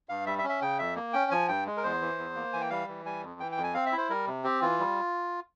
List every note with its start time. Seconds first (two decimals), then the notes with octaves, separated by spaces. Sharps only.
0.09 G2 F5
0.26 G3 E5
0.39 E5
0.44 C#4
0.49 E5
0.61 C#3 G5
0.79 F2 E5
0.96 A#3
1.13 C#4 G5
1.31 F3 G#5
1.48 G2 G5
1.67 G#3
1.77 A#4
1.84 E2 C5
2.01 E3
2.18 E2
2.35 A#3
2.53 E3 G#5
2.61 G5
2.70 G3 F5
2.88 E3
3.05 G3 G#5
3.23 F2
3.40 E3 G5
3.52 G5
3.57 F2
3.63 G#5
3.74 C4 F5
3.86 E5
3.92 E4
3.98 C5
4.09 G3 A#4
4.27 C3
4.44 C4 G4
4.62 E3 F4
4.79 G3